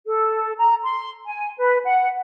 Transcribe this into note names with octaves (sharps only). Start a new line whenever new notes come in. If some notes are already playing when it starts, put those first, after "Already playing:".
A4
A#5
C6
G#5
B4
F#5